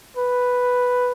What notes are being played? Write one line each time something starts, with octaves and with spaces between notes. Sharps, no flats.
B4